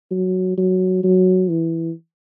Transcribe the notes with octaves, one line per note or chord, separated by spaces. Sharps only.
F#3
F#3
F#3
E3